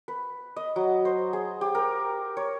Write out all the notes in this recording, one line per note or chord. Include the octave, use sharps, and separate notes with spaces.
B4
D#5
F#3
C5
G#4
G4
A#4
C#5